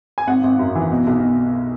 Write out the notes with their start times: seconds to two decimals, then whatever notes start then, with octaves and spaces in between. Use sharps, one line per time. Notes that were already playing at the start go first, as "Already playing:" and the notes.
0.18 G#5
0.27 G#1 F#5
0.44 G#1
0.59 F#2
0.75 E3
0.91 B2
1.07 B1
1.22 B2